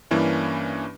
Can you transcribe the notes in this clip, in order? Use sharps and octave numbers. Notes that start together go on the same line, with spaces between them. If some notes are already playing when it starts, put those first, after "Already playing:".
G2 E3 A#3 C#4 D4 E4